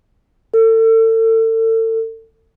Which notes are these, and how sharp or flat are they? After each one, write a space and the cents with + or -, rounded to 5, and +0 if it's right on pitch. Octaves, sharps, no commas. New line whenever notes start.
A4 +35